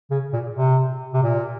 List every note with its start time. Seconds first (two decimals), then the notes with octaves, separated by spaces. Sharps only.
0.11 C#3
0.33 A#2
0.55 C3
1.14 C3
1.23 A#2